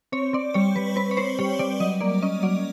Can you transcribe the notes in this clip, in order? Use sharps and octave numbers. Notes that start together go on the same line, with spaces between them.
C4 C#5
C4 D5
G3 C#5
G3 B4
C4 B4
C#5
C4 C5
G3 C#5
G3 D5
F#3 D#5
A#3 D5
C#4 D#5
F#3 D5